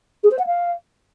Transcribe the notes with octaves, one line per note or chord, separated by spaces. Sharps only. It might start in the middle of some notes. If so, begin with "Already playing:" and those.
G#4
C5
F#5
F5